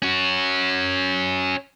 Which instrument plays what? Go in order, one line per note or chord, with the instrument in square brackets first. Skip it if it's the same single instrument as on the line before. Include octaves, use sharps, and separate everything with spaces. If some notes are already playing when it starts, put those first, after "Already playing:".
[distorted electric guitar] C#4 F#4